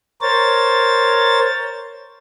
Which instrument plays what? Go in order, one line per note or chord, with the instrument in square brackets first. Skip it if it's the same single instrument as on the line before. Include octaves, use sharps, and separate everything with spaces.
[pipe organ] A#4 C5 C#5 A6